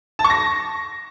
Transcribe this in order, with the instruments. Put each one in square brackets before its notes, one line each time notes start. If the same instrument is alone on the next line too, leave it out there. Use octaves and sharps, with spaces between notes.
[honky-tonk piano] A5
C#6
A#6